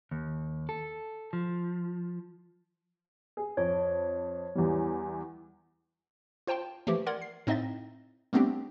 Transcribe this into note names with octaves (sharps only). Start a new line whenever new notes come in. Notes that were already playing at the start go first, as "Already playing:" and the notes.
D#2
A4
F3
G#4
F2 C#5
E2 E3 G3
F4 C5 G5 A5 C6
E3 F3 A3 G4
A#4 D5 F#5 C6 G#6
C7
A2 C4 D#4 D#5 E5 A6
G3 A3 B3 C4 D4 G4